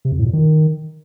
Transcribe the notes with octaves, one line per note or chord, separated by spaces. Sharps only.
C3
F2
A2
A#2
D#3